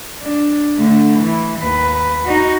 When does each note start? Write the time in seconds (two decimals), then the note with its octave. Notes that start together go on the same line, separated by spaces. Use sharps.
0.22 D4
0.75 D3 A3
1.19 E3
1.60 D#2 B4
2.25 D#4 F#4